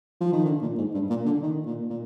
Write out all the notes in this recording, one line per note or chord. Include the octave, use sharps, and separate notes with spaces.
F3
D#3
D3
A#2
G#2
G2
A#2
D3
D#3
A#2
A#2